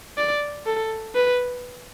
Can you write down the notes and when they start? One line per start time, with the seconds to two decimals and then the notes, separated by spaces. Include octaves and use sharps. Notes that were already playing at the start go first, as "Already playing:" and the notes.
0.17 D5
0.66 A4
1.15 B4